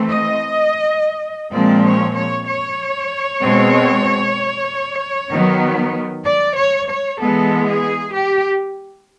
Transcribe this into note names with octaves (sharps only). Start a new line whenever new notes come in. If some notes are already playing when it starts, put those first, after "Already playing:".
Already playing: E3 A3 C4
D#5
A#2 F3 G#3 C4 D5
C#5
C#5
C#5
B2 G#3 C4
D#3 F#3 B3
D5
C#5
C#5
E3 G#3 B3 A4
G#4
G4